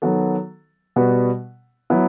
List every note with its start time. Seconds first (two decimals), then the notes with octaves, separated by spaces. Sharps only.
0.02 D#3 F#3 B3 F#4 A4
0.96 B2 G3 B3 F#4 B4
1.90 F#3 B3 E4